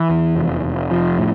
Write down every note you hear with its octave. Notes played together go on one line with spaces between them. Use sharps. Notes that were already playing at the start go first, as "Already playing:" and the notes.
Already playing: E3
E2
F1
F1
F3
A2